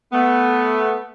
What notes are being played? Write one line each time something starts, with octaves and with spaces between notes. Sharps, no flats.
A3 B3